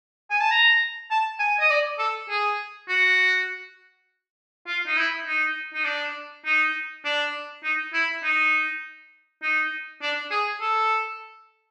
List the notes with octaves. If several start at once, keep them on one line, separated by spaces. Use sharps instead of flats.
G#5
A5
A#5
A5
G#5
D#5
D5
A4
G#4
F#4
F4
D#4
E4
D#4
D#4
D4
D#4
D4
D#4
E4
D#4
D#4
D4
G#4
A4